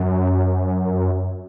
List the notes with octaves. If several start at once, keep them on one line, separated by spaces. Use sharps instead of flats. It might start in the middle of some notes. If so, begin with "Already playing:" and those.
Already playing: F#2